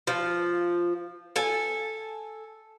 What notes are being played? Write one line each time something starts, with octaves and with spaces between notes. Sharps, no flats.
F3
A4 G#5